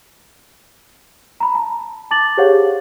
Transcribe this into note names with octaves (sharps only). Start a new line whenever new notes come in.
A#5 B5
A5 A#5
A5 D6 A6 F#7
G4 G#4 C5 C#5 F5 F#5